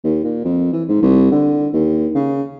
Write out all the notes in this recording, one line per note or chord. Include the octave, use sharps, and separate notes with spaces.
D#2
A#2
F2
E3
G#2
C2
D3
D#2
C#3